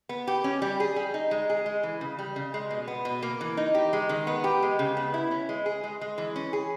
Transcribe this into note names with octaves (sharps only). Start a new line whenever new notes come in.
B3
G4
C#4
G3
G#4
G3
D#4
G#3
G#4
G#3
E3
C#3
G3
C#3
G#3
B2
B3
B2
A#3
E3
D#4
G4
G#3
D#3
B3
G4
G#3
C#3
B3
E4
C#4
G#3
G#4
G#3
G#3
E3
C#4
G#4